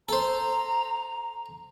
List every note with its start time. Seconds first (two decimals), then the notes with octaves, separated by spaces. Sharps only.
0.09 A4 C5 A#5